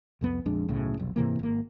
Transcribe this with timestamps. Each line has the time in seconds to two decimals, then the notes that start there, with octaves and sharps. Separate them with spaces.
0.21 C2 F2 B3
0.46 A#1 F2 G#3 D4
0.69 B1 A2 C#3
0.97 F1 B1
1.16 G#2 C3 E3 A#3
1.39 G#1 A#3